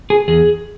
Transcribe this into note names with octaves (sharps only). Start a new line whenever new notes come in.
G#4
E2 G#4